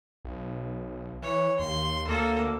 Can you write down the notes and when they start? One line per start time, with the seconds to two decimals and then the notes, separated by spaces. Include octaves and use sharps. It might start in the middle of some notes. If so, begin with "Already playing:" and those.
0.25 B1
1.22 E3 C#5
1.59 D#2 C6
2.07 D2 A#3 A4